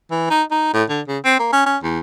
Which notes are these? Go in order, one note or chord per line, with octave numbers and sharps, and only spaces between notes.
E3
D#4
D#4
A2
D3
C#3
C4
A#3
C#4
C#4
E2